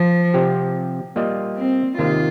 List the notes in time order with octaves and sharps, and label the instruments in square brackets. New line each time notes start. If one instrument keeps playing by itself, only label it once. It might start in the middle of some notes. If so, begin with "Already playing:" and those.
Already playing: [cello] F3
[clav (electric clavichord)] C3 F3 C4 G4
G3 A#3 F4 D#5
[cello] C4
[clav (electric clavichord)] C3 D#3 A#3 [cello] F4